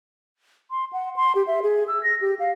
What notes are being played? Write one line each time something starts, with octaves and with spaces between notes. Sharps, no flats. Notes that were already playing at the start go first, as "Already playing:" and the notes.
C6
F#5
C6
G4
E5
G#4
E6
A#6
G4
F5